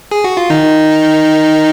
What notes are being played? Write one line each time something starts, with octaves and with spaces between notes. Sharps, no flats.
G#4
F#4
F4
D#3 D#4